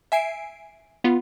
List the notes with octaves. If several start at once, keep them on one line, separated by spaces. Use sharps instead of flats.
E5 G#5 C7 D7
B3 F4